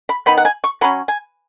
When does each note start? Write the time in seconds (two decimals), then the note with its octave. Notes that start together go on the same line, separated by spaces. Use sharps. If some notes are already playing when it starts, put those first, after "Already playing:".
0.09 B5
0.26 D#3 B3 D#4 B5
0.37 F#5
0.45 G#5
0.64 C#6
0.81 F#3 C#4 B5
1.08 G#5